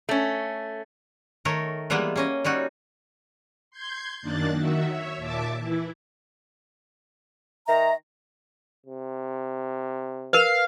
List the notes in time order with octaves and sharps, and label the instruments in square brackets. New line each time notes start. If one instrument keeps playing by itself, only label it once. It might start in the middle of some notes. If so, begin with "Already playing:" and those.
[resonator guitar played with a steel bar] A3 C#4
[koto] D#3 A3 A#4 C#5
E3 G3 G#3 A#3 B3
A#3 C#4 D#5
G3 C#4 D#4 F#4
[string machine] C6 G6 G#6
F#2 D#3 A#3 D4 F#6 A6
D#3 F#4 E5
C#5 E5
D#2 A#2 E5 A5 D6
E3 E4
[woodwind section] D#3 A#5 [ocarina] E5
[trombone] C3
[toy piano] A#4 B4 [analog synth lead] F5